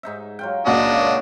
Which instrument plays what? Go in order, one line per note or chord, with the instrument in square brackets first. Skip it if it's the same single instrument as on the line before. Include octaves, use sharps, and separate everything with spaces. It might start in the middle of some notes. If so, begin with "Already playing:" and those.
[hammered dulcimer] G#2 D#4 E5
F#3 F4 G5
[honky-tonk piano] C#2 A#2 F#4 [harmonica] D4 D#5
[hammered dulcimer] A#3 A4 C#5